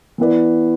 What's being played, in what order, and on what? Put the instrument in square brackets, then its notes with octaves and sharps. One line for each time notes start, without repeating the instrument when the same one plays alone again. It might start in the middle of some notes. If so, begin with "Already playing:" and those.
[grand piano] E3 B3 E4 B4 D5